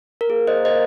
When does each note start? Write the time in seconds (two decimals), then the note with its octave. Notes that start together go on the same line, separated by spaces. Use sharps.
0.21 A#4
0.30 A#3 G#4
0.47 C5 D#5
0.65 C5 D#5